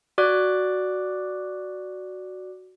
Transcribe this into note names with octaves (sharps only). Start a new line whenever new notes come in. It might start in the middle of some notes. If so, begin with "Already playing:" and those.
F#4 D5 D6 F#6